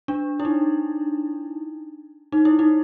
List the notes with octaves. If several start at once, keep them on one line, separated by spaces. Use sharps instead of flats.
D4
E4
D#4
D#4
E4
D#4